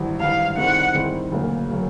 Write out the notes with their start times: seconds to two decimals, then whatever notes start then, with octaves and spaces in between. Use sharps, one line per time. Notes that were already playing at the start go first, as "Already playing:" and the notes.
Already playing: G#1 G2 E3
0.20 G#1 G2 E3 F5
0.57 D#3 G3 C4 E4 G#4 F#5
0.94 D#3 G3 C4 E4 G#4
1.31 E1 D2 C#3 F#3 A#3
1.71 C#3 F#3 A#3